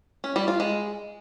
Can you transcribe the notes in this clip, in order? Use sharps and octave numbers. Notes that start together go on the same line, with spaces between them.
C#4
G3
F4
G#3